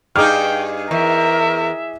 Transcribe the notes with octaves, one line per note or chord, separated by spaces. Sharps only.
G2 D#4 G#4 G5 D6 F6
E2 A#4 E5